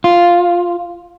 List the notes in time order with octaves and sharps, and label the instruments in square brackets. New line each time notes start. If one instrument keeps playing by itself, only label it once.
[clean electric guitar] F4